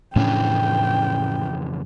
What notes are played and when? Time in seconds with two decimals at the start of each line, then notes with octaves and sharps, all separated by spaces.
0.16 F2 A2 C#3 E3 C#4 D4 G5